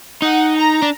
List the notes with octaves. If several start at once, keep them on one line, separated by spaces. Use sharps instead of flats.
D#4 F#5
A#5
D4